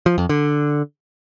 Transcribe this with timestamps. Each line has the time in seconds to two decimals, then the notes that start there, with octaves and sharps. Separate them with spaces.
0.06 F3
0.18 F2
0.29 D3